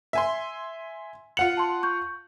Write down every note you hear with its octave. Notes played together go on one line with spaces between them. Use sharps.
E5 G#5 C6
F4 F#5 C#7 F#7
A5 C6
C#6 G6